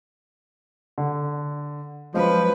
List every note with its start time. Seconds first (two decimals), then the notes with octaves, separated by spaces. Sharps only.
0.98 D3
2.14 F3 F#3 G#3 C#4 B4